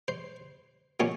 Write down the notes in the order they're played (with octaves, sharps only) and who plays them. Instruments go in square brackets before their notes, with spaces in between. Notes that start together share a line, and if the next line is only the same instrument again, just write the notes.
[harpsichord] C5
A#2 F3 A#3 C#4 C#5